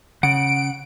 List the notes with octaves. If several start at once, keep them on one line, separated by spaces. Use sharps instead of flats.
C#3 F#5 D7